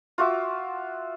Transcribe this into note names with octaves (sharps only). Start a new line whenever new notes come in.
F4 F#4 E5 D6